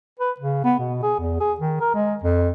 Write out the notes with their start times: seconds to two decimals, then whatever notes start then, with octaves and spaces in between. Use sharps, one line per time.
0.20 B4
0.40 C#3
0.65 B3
0.79 B2
1.03 G#4
1.19 E2
1.40 G#4
1.61 D#3
1.81 A#4
1.95 G#3
2.24 F2